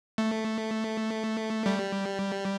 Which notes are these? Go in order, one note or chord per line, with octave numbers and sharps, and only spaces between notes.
A3
G3